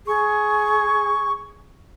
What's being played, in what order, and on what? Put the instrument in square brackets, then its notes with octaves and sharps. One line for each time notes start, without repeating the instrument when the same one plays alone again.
[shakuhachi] G#4 [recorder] C#6